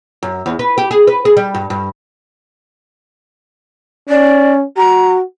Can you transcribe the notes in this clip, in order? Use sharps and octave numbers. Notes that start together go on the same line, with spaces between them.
F#2
E2
B4
G4
G#4
B4
G#4
G3
G2
G2
C#4 D5
F#4 A#5